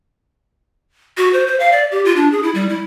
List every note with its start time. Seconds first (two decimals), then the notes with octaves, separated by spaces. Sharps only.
1.17 F#4
1.33 C5
1.47 C5
1.60 F5
1.72 D5
1.92 G4
2.05 F4
2.16 D4
2.32 G#4
2.43 E4
2.55 G3
2.69 E4